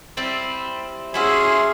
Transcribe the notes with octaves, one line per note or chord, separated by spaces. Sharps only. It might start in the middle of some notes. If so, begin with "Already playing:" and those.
G3 C4 E4
C#4 E4 F#4 G#4 E5 C6